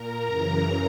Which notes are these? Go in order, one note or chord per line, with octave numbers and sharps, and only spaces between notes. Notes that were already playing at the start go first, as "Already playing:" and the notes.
Already playing: A#2 A#4 A#5
F#2 C#3 E3